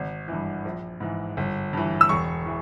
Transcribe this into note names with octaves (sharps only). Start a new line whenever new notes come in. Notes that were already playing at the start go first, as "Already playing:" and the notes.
Already playing: G#1
G2 E3
A#1
G#2 E3
G1
G2 E3
E6
E1 C#6
E3